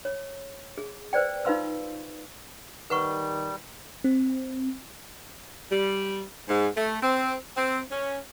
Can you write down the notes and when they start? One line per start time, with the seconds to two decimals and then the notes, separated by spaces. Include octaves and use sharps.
0.05 C#5
0.78 G#4
1.13 B4 C5 D5 G5
1.45 D#4 F4 B4 F5 C6 E6
2.90 D#3 G3 B4 F#5 C#6
4.04 C4
5.70 G3
6.48 G#2
6.76 A3
7.00 C4
7.56 C4
7.89 C#4